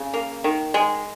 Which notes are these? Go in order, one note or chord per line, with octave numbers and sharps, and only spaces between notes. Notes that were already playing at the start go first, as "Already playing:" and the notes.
Already playing: C#3
A#3
D#3
G#3